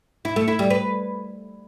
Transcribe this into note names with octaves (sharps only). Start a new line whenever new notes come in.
E4
A3
E4
G3
B4